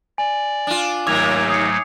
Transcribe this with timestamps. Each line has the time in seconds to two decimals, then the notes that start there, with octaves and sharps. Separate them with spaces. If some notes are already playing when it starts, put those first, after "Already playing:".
0.18 D5 G#5
0.67 D4 F4
1.07 D#2 G#2 F#3 A3 A#3 D6 G#6 F7
1.50 D#6 C7 C#7